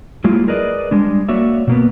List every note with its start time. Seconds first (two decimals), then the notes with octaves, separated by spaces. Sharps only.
0.24 F#3 G#3 A#3 E4 F4
0.47 G#4 A#4 B4 D5 D#5
0.91 G3 G#3 D4
1.29 A#3 F#4 C#5 D5 E5
1.67 B2 A#3 B3